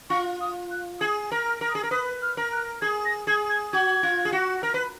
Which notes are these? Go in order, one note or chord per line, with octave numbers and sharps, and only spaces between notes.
F4 C#6
D#6
F#6
G#4 G#6
A#4
F6
A#4
D#6
G#4
A#4
B4 D#6
F6
A#4
F#6
G#4 G#6
A#6
G#4 G#6
G#6
F#4 G#6
F4
G#4
F#4
A#4
B4